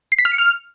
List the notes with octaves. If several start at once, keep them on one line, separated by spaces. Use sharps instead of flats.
C7
B6
F6
C#7
F6